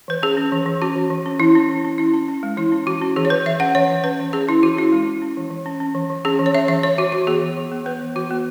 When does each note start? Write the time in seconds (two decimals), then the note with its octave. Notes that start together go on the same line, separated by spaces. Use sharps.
0.08 E3 B4
0.23 C#4 G#4
0.37 C#4
0.52 E3
0.66 E3
0.82 C#4 F#4
0.96 E3
1.10 E3
1.26 C#4
1.39 E3 E4
1.55 C#4
1.69 E3
1.85 C#4
1.98 C#4 E4
2.13 C#4
2.28 C#4
2.43 G#3
2.57 E3 E4
2.72 C#4
2.86 E3 F#4
3.02 C#4
3.16 E3 G#4
3.25 C#5
3.30 E3 B4
3.46 E3 E5
3.60 C#4 F#5
3.75 E3 C#5
3.90 E3
4.04 C#4 B4
4.20 E3
4.33 C#4 G#4
4.48 C#4 E4
4.63 E3 F#4
4.77 C#4 E4
4.92 G#3
5.07 C#4
5.22 C#4
5.37 E3
5.51 E3
5.66 C#4
5.80 C#4
5.95 E3
6.10 E3
6.25 C#4 G#4
6.39 E3
6.46 C#5
6.55 C#4 E5
6.68 E3 E5
6.83 E3 C#5
6.98 E3 F#4
7.12 E3 F#4
7.27 B3 G#4
7.41 E3
7.57 E3
7.72 B3
7.86 B3 B4
8.01 E3
8.15 E3 F#4
8.31 B3